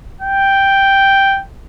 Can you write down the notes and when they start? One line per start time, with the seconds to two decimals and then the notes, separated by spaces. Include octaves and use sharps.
0.21 G5